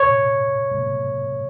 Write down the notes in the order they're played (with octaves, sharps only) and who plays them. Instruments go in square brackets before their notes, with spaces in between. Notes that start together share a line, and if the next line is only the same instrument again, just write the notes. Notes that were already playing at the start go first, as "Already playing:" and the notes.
Already playing: [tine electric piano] C#5